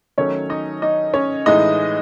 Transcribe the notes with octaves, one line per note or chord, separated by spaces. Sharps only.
D#3 F#3 A3 C#4 C#5
D#4 D#5
D#4 D#5
C#4 C#5
A2 E3 G#3 D#4 D#5